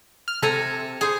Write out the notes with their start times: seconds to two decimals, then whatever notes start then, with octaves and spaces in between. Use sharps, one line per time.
0.28 F6
0.42 C3 A4 G#5 A#5
1.01 G#4 C5